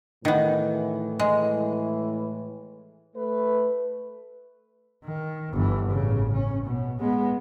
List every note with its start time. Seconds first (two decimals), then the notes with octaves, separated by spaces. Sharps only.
0.25 A2 D#3 E3 B3
1.19 G#3
3.15 A3 B4
5.05 D#3
5.53 G1 E3
5.91 A1 C#3
6.33 C#4
6.65 B2
7.00 G#3 B3